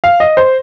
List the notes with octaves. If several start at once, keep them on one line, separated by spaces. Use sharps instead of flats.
F5
D#5
C5